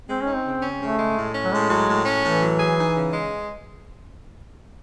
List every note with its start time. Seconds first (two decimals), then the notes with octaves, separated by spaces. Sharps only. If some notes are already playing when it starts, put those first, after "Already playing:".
0.09 G#3 C4
0.22 C#4
0.27 D#4
0.35 C4
0.45 C#3
0.63 C#4
0.80 C#3 A3
0.99 G#3
1.17 A2
1.34 C#4
1.45 F#3
1.52 A2 G#3
1.71 F#3
1.89 A2
2.06 C#4
2.24 A2 E3
2.42 F#3
2.60 G#4
2.78 D#4
2.96 C#3
3.14 G#3